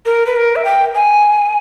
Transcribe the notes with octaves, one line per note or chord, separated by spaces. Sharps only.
A#4
B4
A#4
E5
G5
G#5